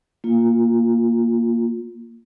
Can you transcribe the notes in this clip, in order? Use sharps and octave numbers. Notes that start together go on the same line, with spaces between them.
A#3 F4